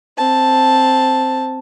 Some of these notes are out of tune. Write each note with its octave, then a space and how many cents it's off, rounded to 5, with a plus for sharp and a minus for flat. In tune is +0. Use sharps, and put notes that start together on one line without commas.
C4 +0 A5 +0